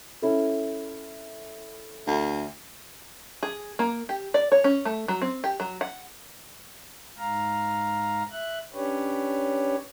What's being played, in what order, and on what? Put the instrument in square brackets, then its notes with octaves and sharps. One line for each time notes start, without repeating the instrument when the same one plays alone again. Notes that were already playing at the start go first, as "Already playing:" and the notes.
[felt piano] C#4 E4 A4
[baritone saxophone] D2
[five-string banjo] G#4
A#3
G4
D5
C#5
C#4
A3
F#3
C4
G4
F#3
F#5
[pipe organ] G#2 F5 A#5
E5 F#6
C#4 D4 G4 B4 C#5